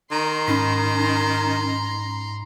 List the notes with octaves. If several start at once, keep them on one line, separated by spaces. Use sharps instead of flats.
D#3 A#5 C6
G#2 C#4 D#4 B5